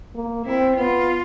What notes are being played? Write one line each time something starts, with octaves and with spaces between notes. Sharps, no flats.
A#3
C4 E4
B3 F4